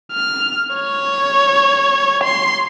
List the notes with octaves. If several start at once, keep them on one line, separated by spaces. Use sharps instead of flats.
F6
C#5
C6